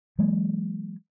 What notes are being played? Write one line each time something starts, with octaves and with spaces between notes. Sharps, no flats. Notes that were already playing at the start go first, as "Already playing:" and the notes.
E3 F#3 G#3 A#3